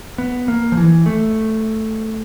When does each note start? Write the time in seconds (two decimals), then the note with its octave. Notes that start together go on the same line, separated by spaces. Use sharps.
0.18 B3
0.48 A#3
0.72 F3
0.77 E3
1.06 A3